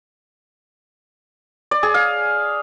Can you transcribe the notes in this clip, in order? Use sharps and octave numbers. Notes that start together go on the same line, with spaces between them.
D5
G#4
F5